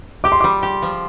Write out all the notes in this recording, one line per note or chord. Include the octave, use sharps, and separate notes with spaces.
G4 D6
C6
G3 D6
G4
F3